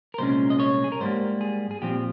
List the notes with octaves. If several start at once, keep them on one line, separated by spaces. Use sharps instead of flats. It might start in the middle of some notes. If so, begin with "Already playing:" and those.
A#4
C2 A#2 G#3 C#4 C5
D#5
C#5
G#4
A#4
G#2 G3 A#3 C5
G#4
G#4
A#2 F3 C4 G4